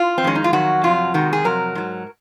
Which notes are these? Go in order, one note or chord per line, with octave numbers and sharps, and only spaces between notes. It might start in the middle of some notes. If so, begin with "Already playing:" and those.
Already playing: F4
C4
F2 D#3 G#3 C#4
D#4
F4
F2 D#3 F#3 F#4
F2 C3 F#3 F4
C3 D#3 G#3 F#4
G#4
F2 C3 F#3 A#4
G#2 F#3